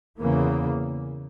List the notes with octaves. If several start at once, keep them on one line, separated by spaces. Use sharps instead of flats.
E2 C#3 E3 A#3